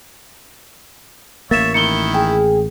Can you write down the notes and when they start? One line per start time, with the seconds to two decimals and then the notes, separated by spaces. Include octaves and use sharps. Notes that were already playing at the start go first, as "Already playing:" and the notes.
1.51 A1 A#3 C#5 E5 A6 E7
1.74 D#3 E4 C#7 G7
2.14 G#4 G5